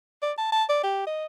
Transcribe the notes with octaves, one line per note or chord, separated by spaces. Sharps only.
D5
A5
A5
D5
G4
D#5